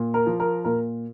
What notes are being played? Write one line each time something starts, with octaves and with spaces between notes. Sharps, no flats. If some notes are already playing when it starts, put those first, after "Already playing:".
Already playing: A#2
A#4
F3
A#4
A#2 A#4